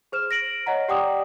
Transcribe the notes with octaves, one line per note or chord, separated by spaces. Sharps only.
G#4 C5 F6 E7
A#6 D7 F#7
C#5 D#5 F#5 A#5
G4 D5 F#5 G5 D6 D#6